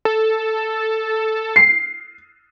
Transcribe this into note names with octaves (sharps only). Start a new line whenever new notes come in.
A4
C7